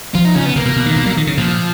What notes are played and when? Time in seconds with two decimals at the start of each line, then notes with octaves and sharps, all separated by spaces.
0.15 F3 F4
0.25 D#4
0.35 C#3 C#4
0.46 B3
0.56 C#3 A#3
0.65 B2
0.76 B2
0.86 D#3
0.96 B2
1.06 F#3
1.17 D#3
1.27 C#3
1.37 A#2 F3